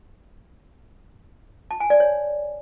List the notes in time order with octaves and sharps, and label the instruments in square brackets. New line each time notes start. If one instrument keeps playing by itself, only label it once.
[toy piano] A5
G#5
D5
C#5